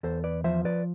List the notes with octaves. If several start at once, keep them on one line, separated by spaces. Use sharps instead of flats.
E2 A4 C5
B4 D5
F3 C5 E5
B4 D5